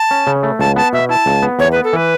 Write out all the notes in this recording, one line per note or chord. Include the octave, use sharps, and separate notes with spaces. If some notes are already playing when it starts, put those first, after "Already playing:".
Already playing: A5
C#4
C#3
A3
C#2 A5
B3 A5
B2 E5
E4 A5
C#2
B3
E2 C#5
B4
B3
A4
E3 B4